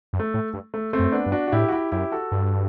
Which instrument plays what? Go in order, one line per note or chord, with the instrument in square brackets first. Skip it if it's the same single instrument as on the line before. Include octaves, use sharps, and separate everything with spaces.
[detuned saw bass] F#2
[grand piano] A3
[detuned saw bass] A2
G2
[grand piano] A3
A3 C4
[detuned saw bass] F#2
[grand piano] B3 D4
[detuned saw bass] G2
[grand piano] D4 F#4
F#4
[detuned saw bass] A2 [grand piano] E4 G4
[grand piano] F#4
E4 G4
[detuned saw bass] F#2 [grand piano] E4 G4
[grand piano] F#4 A4
[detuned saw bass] G2